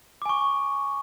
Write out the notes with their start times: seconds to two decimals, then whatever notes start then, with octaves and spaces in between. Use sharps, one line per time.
0.22 D6
0.26 G#5
0.29 C#6